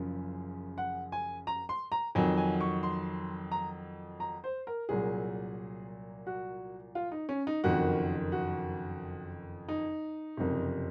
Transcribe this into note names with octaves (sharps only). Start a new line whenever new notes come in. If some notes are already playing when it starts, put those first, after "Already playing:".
Already playing: F#1 F#2 C#3 F3
F#5
G#5
A#5
C6
A#5
F2 D#3 F#3 G#5
G#5
C#6
C6
A#5
A#5
C5
A#4
C2 A#2 F#3 G#4
F#4
F4
D#4
C#4
D#4
F#1 F2 D#3 F#4
F#4
D#4
F#1 F2 C3